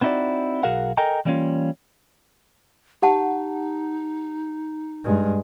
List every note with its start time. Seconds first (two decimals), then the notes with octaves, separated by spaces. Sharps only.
0.01 B3 C4 D#4 E4 F#4 D5
0.63 B1 F#4 G#4 A#4 F5 F#5
0.97 A4 A#4 D#5 G5 G#5 A#5
1.25 E3 G3 A#3 C4 C#4 F4
3.02 D#4 G4 F#5 A5
5.04 G2 G#3